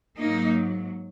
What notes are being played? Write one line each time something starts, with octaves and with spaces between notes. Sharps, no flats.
G#2 F#3 A#3 D#4